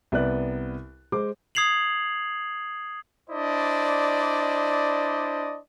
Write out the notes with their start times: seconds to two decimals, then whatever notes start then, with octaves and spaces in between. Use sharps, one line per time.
0.12 C2 B3 B4 D5 F#6
1.12 G#3 C5 D6
1.55 D#6 G#6 C7 F7 F#7
3.29 D4 E4 C5 D5 D#5